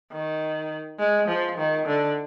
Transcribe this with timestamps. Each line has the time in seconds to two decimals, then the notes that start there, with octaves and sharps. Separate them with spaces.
0.12 D#3
0.99 G#3
1.28 F3
1.58 D#3
1.87 D3